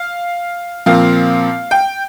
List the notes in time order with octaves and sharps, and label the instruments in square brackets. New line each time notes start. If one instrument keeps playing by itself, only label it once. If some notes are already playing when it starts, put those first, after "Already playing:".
Already playing: [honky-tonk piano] F5
A#2 F3 C4 F5
G5